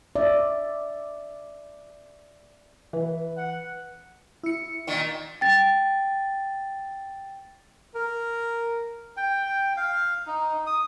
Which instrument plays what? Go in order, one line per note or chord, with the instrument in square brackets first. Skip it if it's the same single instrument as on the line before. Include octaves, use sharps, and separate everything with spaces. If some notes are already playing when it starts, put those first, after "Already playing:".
[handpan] D5 E5
[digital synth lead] E3 [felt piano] B4
[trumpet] F#5
[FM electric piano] E4 C#7
[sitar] A#2 D#3
[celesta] G5 A6
[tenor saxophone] A#4
[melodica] G5
F5
D#4
D#6